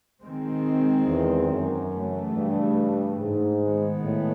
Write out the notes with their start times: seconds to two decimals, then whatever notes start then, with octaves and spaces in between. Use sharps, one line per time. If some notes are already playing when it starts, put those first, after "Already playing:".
0.22 D#3 G#3 C4
1.06 E2
1.48 F#2
1.91 C#3 E3 A3
2.33 G2
3.18 G#2
3.61 D#3 G#3 B3
4.03 A2